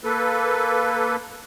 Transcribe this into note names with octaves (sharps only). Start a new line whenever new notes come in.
A#3 A4 B4